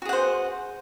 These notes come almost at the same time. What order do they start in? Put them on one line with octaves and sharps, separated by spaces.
F#4 G#4 F#5 C5